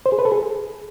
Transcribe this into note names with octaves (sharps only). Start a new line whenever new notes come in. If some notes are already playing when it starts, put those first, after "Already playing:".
C5
G#4
B4
A4
G#4